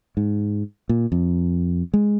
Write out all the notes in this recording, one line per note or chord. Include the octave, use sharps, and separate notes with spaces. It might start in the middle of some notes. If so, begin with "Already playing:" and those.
G#2
A#2
F2
G#3